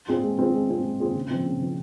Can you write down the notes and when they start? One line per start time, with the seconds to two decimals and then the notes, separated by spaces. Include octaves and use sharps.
0.09 C4 F4 G#4
0.23 G#3
0.39 C4 F4 G#4
0.55 G#3
0.69 C4 F4 G#4
0.85 G#3
1.00 C4 F4 G#4
1.15 C#3
1.31 F3 C4
1.46 C#3
1.61 F3 C4